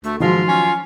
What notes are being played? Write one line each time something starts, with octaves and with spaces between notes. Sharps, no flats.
D2 A3
G#2 D#3 F3 F#3 F4
C#4